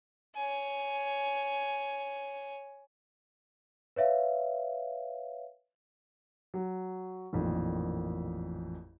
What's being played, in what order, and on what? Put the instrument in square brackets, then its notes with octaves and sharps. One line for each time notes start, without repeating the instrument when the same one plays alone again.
[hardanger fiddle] C#5 G#5
[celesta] B4 C#5 E5 F5
[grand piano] F#3
A1 F2 A#2 D#3